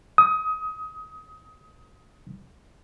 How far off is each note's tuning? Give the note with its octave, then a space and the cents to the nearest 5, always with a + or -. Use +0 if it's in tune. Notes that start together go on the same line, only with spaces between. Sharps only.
D#6 +25